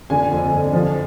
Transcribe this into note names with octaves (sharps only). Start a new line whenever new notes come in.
D3 G#5
F2
F2
F3